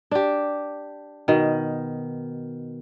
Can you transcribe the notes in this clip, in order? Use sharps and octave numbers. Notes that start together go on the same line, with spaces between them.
D4 G4
B2 D#3